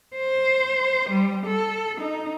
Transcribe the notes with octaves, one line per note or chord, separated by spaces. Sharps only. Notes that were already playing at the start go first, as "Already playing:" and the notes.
C5
G3
A4
D#4